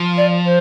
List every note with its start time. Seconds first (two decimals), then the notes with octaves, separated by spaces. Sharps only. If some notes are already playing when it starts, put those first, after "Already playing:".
Already playing: F3
0.17 D5
0.45 C5